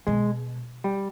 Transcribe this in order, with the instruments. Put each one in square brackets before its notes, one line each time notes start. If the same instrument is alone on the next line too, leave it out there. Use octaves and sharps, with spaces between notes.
[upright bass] B2 [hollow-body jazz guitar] G#3
[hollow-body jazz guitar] G3